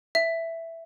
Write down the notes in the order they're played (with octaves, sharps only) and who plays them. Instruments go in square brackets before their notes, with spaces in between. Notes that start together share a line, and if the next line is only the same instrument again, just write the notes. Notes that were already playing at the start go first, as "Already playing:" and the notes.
[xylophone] E5